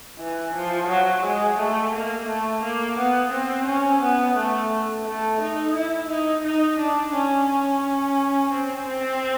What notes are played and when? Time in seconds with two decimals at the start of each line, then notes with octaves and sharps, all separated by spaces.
0.19 E3
0.55 F3
0.89 F#3
1.24 G#3
1.59 A3
1.93 A#3
2.28 A3
2.63 A#3
2.98 B3
3.32 C4
3.67 C#4
4.02 B3
4.37 A3
5.06 A3
5.40 D#4
5.75 E4
6.10 D#4
6.44 D#4
6.79 D4
7.14 C#4
7.49 C#4
8.52 C4
8.88 C4